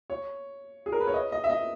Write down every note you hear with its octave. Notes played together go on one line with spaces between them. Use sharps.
C#5
G#4
A#4
B4
C#5
D#5
D#5
E5
D#5